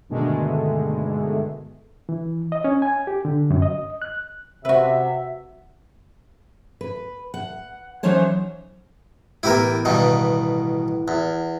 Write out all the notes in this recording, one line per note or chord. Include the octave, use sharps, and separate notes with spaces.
G2 B2 D3 D#3 G#3 A3
E3
D#5
C#4
G#5
G4
D3
F#2
D#5
F#6
C3 F#4 B4 E5
B4
F#5
E3 F#3 C#4 D#4 C5 C#5
A2 E3 B3 E4 G4 A#4
G2 B2 D#3
E2